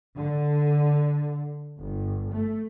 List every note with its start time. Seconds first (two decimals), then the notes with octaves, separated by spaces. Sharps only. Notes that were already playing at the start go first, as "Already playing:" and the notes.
0.16 D3
1.79 G1
2.32 A3